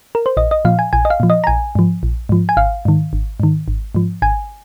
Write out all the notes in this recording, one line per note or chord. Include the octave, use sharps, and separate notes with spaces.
A#4
C5
A#1 D#5
D#5
A#2 F3 F5
G#5
A#1 G#5
D#5
F5
A#2 F3
D#5
A#5
A#1 G#5
G#2 F3
A#1
G#2 F3
G#5
G#1 F5
G#2 D#3
G#1
G#2 D#3
G#1
G#2 F3
G#1 G#5